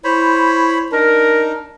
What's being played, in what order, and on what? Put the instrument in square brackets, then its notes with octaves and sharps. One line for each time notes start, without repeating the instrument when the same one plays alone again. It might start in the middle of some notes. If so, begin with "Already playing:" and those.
[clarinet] E4 [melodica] C5 C#5 B5
[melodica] D4 D#4 [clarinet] A#4